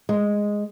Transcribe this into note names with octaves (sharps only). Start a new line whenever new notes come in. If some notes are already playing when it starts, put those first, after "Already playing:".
G#3